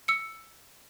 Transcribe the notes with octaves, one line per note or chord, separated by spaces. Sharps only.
E6 C#7